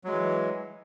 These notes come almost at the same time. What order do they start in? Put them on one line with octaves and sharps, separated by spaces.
F#3 G#3 E3